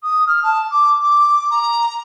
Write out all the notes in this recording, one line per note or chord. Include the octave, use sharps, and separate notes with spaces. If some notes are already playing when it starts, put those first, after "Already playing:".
D#6
F6
A5
D6
D6
A#5